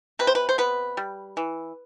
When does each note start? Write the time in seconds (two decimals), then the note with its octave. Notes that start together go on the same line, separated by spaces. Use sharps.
0.19 C3 B4
0.27 C5
0.35 B4
0.49 C5
0.58 B3 B4
0.97 G3
1.37 E3